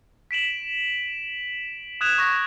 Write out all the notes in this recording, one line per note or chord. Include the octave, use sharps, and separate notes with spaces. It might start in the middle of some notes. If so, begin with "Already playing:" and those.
B6 D7 E7 F#7
D#6 F#6 G#6 E7 F7
C#6 A#6 E7